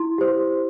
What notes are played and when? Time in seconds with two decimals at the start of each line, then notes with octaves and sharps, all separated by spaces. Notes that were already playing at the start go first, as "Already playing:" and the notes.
Already playing: E4 C6
0.18 G4 C5